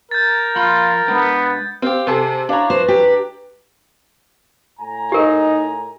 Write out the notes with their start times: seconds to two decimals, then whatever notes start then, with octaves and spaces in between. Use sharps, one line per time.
0.11 A#4 G6 A6
0.56 F3 F4 B5 C6
1.08 G#3 B3 D4
1.82 C4 G4 F5
2.07 C3 G#4 A4 C6
2.49 D4 E4 C#5 F5 A#5
2.70 B4 C5
2.88 G4
4.79 A2 G#5 A#5
5.12 D#4 G4 A#4